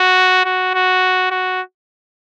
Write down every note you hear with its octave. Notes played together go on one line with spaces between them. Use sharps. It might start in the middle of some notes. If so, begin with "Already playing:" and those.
Already playing: F#4
F#4
F#4
F#4